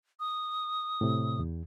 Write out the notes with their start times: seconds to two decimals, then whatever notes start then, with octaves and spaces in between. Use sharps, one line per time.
0.20 D#6
1.01 A2 C3
1.39 E2